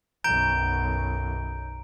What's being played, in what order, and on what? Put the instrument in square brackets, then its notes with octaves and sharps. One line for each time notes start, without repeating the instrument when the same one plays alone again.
[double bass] B1 F#2 [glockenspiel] A#5 D7 [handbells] G6